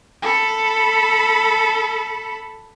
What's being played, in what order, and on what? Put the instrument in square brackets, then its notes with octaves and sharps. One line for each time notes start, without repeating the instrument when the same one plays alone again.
[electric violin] A4 B5